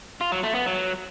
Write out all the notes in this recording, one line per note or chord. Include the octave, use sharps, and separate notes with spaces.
F4
F#3
A3
B3
F#3